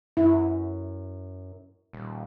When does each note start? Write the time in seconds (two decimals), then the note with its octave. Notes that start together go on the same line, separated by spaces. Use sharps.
0.17 F#2 E4
1.93 D#1